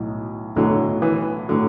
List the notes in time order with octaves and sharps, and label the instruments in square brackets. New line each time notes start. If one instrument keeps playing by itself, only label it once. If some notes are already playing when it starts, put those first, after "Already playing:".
Already playing: [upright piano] B1 A2 F#3
[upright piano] B1 A2 F#3 [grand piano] D3
[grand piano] E3
[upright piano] A2 F#3 [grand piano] D3